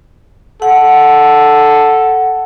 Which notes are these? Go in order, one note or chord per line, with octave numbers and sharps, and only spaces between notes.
A4 F#5